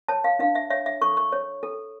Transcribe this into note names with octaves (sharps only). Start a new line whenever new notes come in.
C#5 A5
F5
D4 F5
E5
C#5 E5
E5
A4 C#6
C#6
C#5
A4